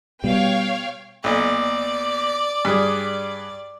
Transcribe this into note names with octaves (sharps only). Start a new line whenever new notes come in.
B2 G3 C#5 F5 G5
B1 A#2 D5
G2 G#4